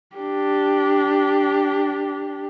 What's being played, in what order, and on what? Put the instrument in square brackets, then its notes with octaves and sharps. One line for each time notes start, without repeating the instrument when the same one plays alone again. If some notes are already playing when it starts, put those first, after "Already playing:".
[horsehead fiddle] D4 G4